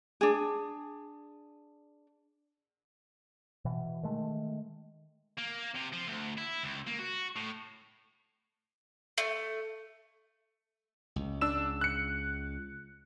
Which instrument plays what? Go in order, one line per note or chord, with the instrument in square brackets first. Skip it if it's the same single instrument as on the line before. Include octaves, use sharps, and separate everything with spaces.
[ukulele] D4 G#4
[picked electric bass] B2 E3
D#3 G#3 A3
[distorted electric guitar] A#3
C3
F3
D2
E4
C#2
A#3
F#4
A2
[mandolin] A3
[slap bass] C#2
[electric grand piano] D4 E6 E7
F#6 C#7